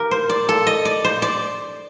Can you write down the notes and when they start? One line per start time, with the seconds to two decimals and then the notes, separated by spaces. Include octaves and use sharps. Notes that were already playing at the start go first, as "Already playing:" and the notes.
Already playing: D#3 G4 A#4
0.11 C5
0.29 D5
0.49 A4
0.67 D#5
0.85 D5
1.04 C5
1.22 D5